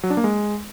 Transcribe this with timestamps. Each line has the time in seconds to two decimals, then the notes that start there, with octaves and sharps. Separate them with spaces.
0.03 F#3
0.10 D4
0.17 A#3
0.24 G#3